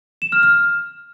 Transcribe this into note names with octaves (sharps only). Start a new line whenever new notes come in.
E7
F6
F6